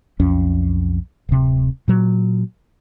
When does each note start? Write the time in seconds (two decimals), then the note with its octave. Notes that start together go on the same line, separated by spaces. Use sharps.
0.19 B1 F2 C#4
1.29 D1 C3
1.88 A#2 F#3